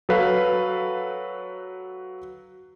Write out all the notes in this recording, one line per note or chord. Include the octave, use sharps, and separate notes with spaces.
F#3 A4 B4 F5